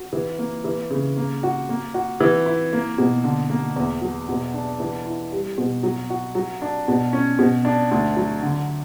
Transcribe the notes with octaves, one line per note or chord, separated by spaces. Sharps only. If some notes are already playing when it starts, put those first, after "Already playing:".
Already playing: F#4
E3
A#3
E3
C#3
A#3
F#4
A#3
F#4
E3
E4
A#3
B2
D3
A#3
E2
F#3
B2
D4
E3
E4
G3
B2
F#3
F#4
F#3
D4
B2
C#4
B2
D4
D2
F#3
D3